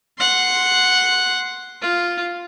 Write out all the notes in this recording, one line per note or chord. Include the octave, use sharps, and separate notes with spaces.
F#5 C6
F4